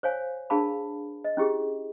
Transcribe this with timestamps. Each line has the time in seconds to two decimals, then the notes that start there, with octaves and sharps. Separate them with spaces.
0.03 C5 C#5 F5 G#5
0.50 D4 G#4 A#4 F5 A5 B5
1.25 D#5
1.37 C#4 E4 G4 G#4